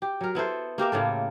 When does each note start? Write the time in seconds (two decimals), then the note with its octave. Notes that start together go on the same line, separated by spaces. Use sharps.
0.02 G4
0.21 F#3 A#4
0.35 B3 E4 A4 C5
0.78 A#3 G4 A#4 E5
0.92 A2 C#3 A#3 A4